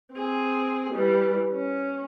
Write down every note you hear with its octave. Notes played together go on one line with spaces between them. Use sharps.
C4 G#4
E3 G3
C#4